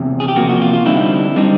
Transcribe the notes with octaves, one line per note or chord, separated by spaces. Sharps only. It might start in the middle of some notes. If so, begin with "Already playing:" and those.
Already playing: E2 C3
G#4
G4
E2 C3 F3 A#3 F#4
F#4
F4
F4
D3 G3 C4 D#4 E4
D3 G3 C4 D#4